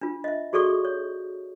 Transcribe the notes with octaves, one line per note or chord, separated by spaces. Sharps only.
D4 F4
D#5 E5
F#4 G#4 A4 D5 C#6 D#6
C#5